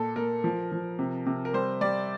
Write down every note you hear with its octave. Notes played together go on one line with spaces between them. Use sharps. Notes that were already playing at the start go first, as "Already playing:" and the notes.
Already playing: A#2 A4
A#2 A#4
F3
F3
C3
C3
A#4
G3 C5
G3 D5